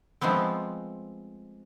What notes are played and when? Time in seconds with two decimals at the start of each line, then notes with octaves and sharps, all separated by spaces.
0.21 F3 G#3 A3 B3 C4